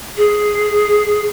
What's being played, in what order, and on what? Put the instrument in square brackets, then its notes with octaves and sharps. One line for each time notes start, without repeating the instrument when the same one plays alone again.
[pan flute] G#4